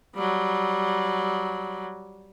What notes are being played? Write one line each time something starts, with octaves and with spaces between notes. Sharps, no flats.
F#3 G3